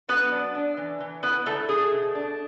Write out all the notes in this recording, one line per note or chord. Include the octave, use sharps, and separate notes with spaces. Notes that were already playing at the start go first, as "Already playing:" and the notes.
F#3 B3 B4
D4
D4
E3
E3
B3 E4 B4
D3 A3 A4
A3 G#4
B2
D4